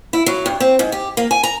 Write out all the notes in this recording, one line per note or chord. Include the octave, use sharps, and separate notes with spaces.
E4
F#3
G2
C4
G#2
G4
A#3
G#5
A#5